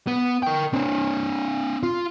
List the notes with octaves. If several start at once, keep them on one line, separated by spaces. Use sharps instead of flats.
B3
A#4 G5
C4 D4
F4